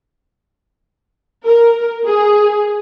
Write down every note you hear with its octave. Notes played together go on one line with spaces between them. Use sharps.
A#4
G#4